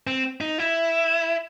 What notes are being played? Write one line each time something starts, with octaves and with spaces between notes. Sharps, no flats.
C4
D#4
E4